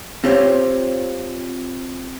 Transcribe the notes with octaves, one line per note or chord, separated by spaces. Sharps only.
C4 F4 G4 C5 C#5